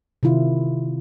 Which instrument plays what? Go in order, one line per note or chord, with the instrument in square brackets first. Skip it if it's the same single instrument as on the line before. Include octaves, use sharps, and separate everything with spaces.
[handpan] C3 D#3 E4 F4